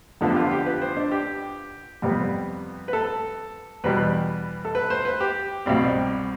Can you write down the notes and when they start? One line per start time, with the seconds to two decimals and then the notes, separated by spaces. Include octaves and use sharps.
0.21 F2 D3 F3 B3 A4
0.31 G4
0.36 F4
0.51 G4
0.66 B4
0.82 C5
0.97 D4
1.11 G4
2.02 F2 C3 G3 B3
2.88 B4
2.93 A4
3.84 E2 B2 G3 B4
4.65 A4
4.75 B4
4.90 C5
5.05 B4
5.20 G4
5.66 C2 B2 G3 C4